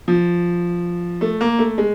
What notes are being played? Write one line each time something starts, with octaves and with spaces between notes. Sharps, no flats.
F3
A3
A#3
A3
G#3